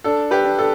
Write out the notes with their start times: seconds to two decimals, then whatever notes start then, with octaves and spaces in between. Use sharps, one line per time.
0.04 D4 A4
0.31 G4 B4
0.45 D4
0.58 A4